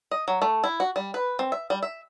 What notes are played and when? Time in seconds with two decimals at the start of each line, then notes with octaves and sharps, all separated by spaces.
0.11 D#5
0.28 F#3
0.42 A3
0.64 E4
0.80 F#4
0.96 G3
1.14 B4
1.39 C4
1.52 E5
1.70 G3
1.83 E5